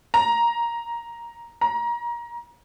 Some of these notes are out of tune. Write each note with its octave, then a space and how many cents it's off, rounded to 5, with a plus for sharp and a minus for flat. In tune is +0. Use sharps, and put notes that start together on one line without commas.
A#5 +5
A#5 +25